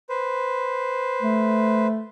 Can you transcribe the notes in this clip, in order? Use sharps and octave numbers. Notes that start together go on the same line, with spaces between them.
B4 C5
A3